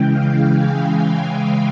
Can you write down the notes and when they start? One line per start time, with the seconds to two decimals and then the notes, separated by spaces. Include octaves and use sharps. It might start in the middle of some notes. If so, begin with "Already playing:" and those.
Already playing: C#3 E3 G#3 G5
0.09 F5
0.54 G#5